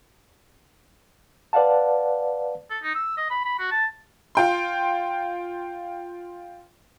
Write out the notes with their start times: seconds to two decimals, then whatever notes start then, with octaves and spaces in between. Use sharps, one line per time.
1.53 B4 D5 F5 F#5 A5
2.70 A4
2.83 D#4
2.95 E6
3.17 D#5
3.30 B5
3.45 B5
3.59 F#4
3.71 A5
4.35 F4 G5 C6